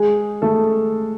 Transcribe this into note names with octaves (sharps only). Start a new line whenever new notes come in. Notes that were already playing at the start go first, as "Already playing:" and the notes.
Already playing: G#3 G#4
A3 A4